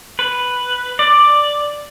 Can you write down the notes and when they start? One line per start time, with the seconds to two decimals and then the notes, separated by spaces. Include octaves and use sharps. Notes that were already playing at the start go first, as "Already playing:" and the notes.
0.19 B4
0.99 D5